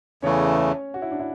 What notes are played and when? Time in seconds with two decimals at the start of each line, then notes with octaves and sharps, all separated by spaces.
0.22 E2 C#3 E3 A3 C#4 C#5
0.58 C#4 C#5
0.94 F#4
1.02 E4
1.11 D4
1.20 E4